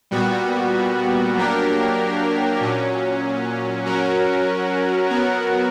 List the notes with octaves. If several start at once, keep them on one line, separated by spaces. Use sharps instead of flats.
A#2 G3 B3 F#4
F#3 A#3 D4 G4 A#4
A#2 F#3 C#4
F#3 C#4 F#4 A#4
F#3 B3 F#4 A#4